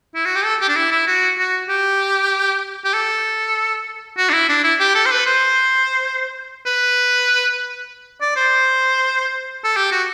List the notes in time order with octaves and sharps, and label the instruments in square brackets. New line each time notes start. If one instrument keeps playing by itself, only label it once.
[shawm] E4
F#4
G4
A4
G4
D4
E4
E4
F#4
F#4
G4
G4
A4
F#4
D4
E4
D4
E4
G4
A4
C5
B4
C5
B4
D5
C5
A4
G4
F#4